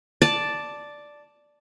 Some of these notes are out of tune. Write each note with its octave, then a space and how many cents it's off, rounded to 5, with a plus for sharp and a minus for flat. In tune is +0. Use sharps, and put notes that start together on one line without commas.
D5 +0 A5 +0